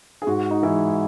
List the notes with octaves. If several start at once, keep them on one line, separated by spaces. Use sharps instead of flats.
G#4
G#2 F#4
D#4
E3 G#3 E4